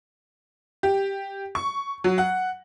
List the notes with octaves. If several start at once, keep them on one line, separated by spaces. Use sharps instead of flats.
G4
C#6
F#3
F#5